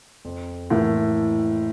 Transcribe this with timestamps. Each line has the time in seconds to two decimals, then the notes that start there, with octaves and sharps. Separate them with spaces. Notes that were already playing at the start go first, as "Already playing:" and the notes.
0.25 F2
0.70 A2 E3 A#3 E4 A#4